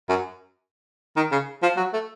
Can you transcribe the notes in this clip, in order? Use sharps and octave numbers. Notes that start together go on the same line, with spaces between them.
F#2
D#3
C#3
F3
F#3
A3